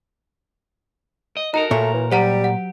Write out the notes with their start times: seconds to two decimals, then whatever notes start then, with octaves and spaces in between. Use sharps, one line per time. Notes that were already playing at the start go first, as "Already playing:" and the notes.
1.37 D#5
1.54 D#4 F#4 A4 A#4 A#5
1.71 A#2 A3 C#5
1.94 E3
2.12 F#3 G3 G4 C5 F#5 A#5
2.44 F#5